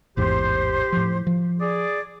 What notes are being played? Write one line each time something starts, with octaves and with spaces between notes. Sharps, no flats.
A1 E2 G#2 G4 C5
A2 F3
F3
G#4 D5